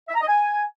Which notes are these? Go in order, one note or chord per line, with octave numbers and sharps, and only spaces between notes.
E5
A#5
D#5
G#5